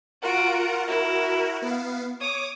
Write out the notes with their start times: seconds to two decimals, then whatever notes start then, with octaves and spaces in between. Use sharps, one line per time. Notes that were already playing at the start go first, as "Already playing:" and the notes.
0.22 F4 F#4 A#4 F#5 D7
0.87 E4 F#4 A#4
1.62 B3 F5
2.21 C#5 D6 D#6